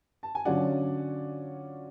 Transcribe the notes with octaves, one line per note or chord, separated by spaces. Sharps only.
A5
G#5
D3 F#3 C#4 F4 D5 F#5